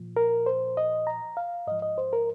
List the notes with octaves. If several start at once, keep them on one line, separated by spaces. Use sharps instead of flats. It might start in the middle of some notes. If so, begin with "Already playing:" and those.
Already playing: A#2 F3
A#4
C5
D#5
A#5
F5
G#2 F3 D#5
D#5
C5
A#4